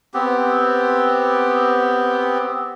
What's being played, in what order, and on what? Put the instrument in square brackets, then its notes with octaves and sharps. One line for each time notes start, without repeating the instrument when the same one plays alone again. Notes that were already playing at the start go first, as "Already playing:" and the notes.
[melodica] B3 C4 G4